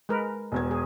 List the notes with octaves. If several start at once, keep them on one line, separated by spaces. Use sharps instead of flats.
G#3 A#4 B4
E1 E2 G#6
G#4